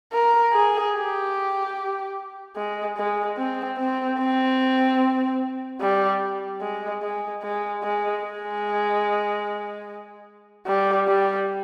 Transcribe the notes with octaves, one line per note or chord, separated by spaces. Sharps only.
A#4
G#4
G4
G#3
G#3
C4
C4
C4
G3
G#3
G#3
G#3
G#3
G#3
G3
G3